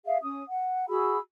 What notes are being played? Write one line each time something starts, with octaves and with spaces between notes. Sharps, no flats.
G#4 E5 F5
C#4 D#6
F#5
F#4 G#4 B5 E6